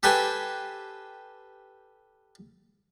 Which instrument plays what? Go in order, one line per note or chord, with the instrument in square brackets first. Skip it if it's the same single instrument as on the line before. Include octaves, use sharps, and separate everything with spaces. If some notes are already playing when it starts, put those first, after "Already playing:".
[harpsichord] G4 A4 B4 C5 G5 G#5